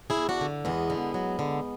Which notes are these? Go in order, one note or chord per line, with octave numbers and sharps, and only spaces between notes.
E4 G#4
E2
D4 F#4
D3
E2 G#3 B3
D3
F#3
D3